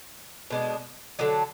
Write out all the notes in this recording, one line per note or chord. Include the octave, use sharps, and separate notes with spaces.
B2 G#3 D4
D3 F#3 D4